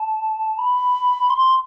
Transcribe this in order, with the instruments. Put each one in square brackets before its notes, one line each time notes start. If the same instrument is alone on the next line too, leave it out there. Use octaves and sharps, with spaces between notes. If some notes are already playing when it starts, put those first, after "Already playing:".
Already playing: [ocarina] A5
B5
C6